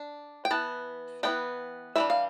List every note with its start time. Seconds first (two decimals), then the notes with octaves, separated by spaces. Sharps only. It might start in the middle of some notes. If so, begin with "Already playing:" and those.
Already playing: D4
0.45 G5
0.51 E3 B3 A5
1.23 E3 B3 D4 G5
1.96 E3 G3 D4 E5
2.10 F5